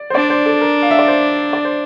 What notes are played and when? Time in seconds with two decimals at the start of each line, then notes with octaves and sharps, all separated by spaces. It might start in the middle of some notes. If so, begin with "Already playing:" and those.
Already playing: D5
0.10 C5
0.15 D4 D5
0.30 C5
0.46 A4
0.61 A#4
0.82 F5
0.91 E5
0.99 D5
1.08 C5
1.53 D5
1.65 C5